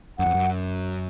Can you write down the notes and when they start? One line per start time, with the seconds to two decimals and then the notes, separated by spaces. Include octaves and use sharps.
0.19 F#2 F#5
0.26 F2
0.34 F#2